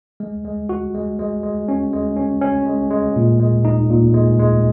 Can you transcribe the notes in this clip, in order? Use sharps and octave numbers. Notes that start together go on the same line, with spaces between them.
G#3
G#3
F#4
G#3
G#3
G#3
C#4
G#3
C#4
C#4
G#3
G#3
A#2
G#3
D#4
A#2
G#3
G#3